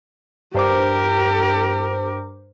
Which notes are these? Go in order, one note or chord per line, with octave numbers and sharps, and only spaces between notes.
G2 G4 A#4 C5 D6